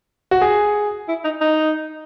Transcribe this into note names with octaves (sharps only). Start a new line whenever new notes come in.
F#4
G#4
E4
D#4
D#4